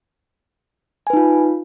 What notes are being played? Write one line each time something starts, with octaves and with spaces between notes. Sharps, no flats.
D#4 F4 B4 G#5